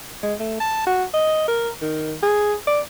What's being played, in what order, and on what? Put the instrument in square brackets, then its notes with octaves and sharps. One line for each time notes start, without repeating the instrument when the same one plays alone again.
[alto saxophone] G#3
A3
A5
F#4
D#5
A#4
D#3
G#4
D5